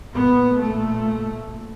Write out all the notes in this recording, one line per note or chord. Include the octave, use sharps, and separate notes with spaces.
A#2 B3
A3